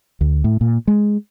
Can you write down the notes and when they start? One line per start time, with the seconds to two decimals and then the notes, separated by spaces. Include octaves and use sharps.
0.21 D2
0.44 A2
0.61 A#2
0.87 G#3